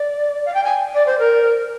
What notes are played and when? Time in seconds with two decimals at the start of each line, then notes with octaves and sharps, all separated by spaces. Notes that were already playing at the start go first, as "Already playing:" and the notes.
Already playing: D5
0.46 F5
0.54 G5
0.64 G#5
0.94 D5
1.06 C5
1.19 A#4